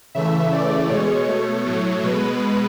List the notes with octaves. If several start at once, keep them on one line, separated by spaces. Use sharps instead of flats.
C#3 E3 A3 E5
C#3 E3 A3 D5
B2 G#3 C#5
B2 A3
A2 F#3 A3
B2 G#3 B4